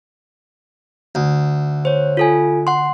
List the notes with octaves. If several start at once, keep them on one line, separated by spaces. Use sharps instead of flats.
D2
C5 C#5
F4 A4 G#5
F#5 C6